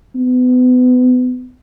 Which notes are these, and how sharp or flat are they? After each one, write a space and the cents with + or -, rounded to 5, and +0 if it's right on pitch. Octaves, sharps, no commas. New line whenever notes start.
B3 +30